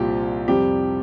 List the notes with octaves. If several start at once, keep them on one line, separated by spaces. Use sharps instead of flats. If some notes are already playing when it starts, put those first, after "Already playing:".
Already playing: C2 A#2 F3 C4 G4
F2 C3 G3 G4